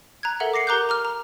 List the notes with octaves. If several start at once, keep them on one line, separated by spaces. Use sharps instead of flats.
A#5 F#6 G#6
A4 A#4 E5 F#5
D6 A#6 C7 C#7
G4 A#4 A#5 D6 F#6 G6
A#5 D6 F6
A#5